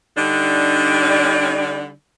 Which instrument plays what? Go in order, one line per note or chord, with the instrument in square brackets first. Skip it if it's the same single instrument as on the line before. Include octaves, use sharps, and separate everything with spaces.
[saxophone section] D3 G3 D4 D#4